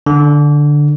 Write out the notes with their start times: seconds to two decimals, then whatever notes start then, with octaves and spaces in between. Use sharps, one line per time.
0.06 D3